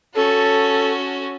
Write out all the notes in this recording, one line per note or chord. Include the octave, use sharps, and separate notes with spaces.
C#4 F#4 A4